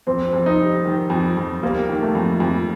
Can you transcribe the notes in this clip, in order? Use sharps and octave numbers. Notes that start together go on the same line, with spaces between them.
F2 C4
F2
D#4
G3
D#3
F2
F2
G3 A#3
D#3
A3
F2
F2